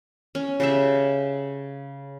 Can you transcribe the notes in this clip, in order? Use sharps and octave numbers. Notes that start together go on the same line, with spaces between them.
C#4
C#3 G4 E5